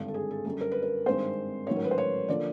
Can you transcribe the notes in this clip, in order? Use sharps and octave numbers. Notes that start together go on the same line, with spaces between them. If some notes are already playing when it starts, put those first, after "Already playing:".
Already playing: G#1 G2 D3
A4
G#4
A4
F#2 D3 G3 A4
A#4
B4
A#4
G#1 G2 D#3 G#3 C4 C5
A1 G#2 D#3 F#3 C#5
A#4
B4
C5
C#5
D3 F3 A#3 D5